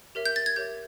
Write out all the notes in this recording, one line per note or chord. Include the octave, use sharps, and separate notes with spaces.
G4 A#4 C#5 E5
G6
A6
G#6
G4 A#4 C#5 E5 G6